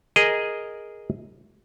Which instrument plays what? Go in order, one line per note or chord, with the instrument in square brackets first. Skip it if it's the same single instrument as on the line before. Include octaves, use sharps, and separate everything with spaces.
[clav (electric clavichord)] G#4 A#4 D#5